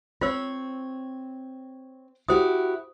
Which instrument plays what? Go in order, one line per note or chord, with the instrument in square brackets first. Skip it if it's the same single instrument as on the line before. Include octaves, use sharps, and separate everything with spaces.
[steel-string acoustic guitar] C4 C#5 [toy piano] F4 C5 E6
[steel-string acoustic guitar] E4 F#4 G4 [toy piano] C5 D#6